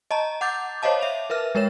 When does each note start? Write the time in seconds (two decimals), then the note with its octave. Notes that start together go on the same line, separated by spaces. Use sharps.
0.11 D#5 A5 A#5
0.41 F#5 D6 G6 A6
0.82 C5 C#5 D#5 F5 A5 D6
1.01 E5 F7
1.30 A#4 B4 E5 F6
1.55 G#3 A#4 C#5 E7